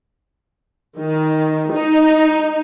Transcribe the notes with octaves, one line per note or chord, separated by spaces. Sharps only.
D#3
D#4